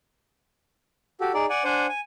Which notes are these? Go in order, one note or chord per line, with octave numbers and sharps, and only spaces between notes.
F#4 G4 A4
D#4 G#4 D5
D5 F#5 G#5
D4 C5 F#5 G#5
G#5